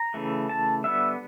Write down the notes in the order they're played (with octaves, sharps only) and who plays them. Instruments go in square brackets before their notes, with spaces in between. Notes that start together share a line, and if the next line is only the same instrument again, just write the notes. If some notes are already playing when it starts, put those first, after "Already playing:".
Already playing: [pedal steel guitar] A#5
C#3 E3 A3
A5
D3 G3 B3 E5